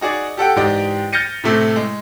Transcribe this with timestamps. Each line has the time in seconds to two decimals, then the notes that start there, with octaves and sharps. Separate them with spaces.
0.01 D#4 F#4 G#4 D5
0.37 G4 A4 F#5 G5
0.56 G#2 E3 G4 D5 D#5 G5
1.13 F6 G6 A6 A#6 C#7 D#7
1.44 A2 C3 A3 E4
1.76 G#3